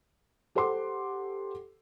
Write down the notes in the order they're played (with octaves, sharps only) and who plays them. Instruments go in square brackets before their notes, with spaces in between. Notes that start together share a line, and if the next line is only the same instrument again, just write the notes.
[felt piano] G4 A4 C5 F#5 C6 D6